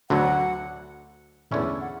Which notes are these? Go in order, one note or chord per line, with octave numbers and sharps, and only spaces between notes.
D2 D3 F#3 F#5
E2 D3 A3 C#4 E4 D5
F#5